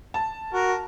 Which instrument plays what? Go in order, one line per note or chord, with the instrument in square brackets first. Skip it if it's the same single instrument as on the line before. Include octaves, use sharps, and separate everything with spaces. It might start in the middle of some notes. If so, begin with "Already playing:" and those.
[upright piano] A5
[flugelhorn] F#4 [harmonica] A#4